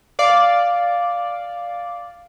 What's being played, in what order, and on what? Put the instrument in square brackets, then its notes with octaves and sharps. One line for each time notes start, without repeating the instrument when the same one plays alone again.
[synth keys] D5 F5